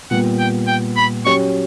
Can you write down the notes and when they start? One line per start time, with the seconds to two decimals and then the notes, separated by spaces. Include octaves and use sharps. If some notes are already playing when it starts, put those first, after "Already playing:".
0.11 A#2 G3 B3 F#5
0.39 G5
0.67 G5
0.97 B5
1.25 F#3 C#4 G4 C#5 C#6